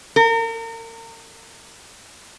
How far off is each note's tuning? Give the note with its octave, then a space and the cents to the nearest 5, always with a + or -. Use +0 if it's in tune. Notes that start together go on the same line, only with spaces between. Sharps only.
A#4 -35